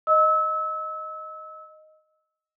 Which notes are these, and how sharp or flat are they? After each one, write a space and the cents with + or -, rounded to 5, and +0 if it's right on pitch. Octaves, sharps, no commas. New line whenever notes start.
D#5 +0 E6 -25